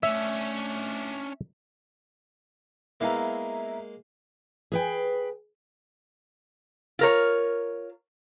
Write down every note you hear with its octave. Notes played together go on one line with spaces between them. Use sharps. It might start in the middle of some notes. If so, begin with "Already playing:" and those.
A3 C#4 D4 E5
G#3 A#3 B3 E4 E5 F5 A#5
G#4 B4 G5
F4 A#4 C#5